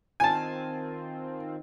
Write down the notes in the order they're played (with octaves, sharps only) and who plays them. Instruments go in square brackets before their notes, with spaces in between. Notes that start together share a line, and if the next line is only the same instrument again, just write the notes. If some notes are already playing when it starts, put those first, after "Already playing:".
[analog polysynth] D#3 C4 F4 [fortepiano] G#5 A5